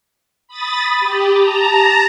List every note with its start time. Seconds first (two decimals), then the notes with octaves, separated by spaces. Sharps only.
0.48 B5 D#6 A6
1.00 G4
1.31 A5 A#5